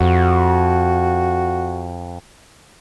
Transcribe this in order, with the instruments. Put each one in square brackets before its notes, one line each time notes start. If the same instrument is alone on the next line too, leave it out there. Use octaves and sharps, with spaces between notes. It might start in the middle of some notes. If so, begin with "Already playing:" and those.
[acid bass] F2 [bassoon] F#4